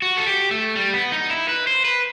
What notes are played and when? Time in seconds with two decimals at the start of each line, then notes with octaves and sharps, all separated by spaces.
0.02 F#4
0.17 A4
0.26 G4
0.51 A3
0.75 G3
0.94 B3
1.12 D#4
1.30 E4
1.49 B4
1.67 C5
1.85 B4